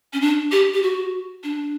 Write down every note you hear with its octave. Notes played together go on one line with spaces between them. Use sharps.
C#4
D4
G4
G4
F#4
D4